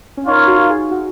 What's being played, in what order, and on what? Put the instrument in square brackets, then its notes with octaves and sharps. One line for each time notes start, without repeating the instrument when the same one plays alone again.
[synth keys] C#4
[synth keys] D#4 [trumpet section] F4 A#4 C#5 F5
[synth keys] F#4
F#4
G#4
F#4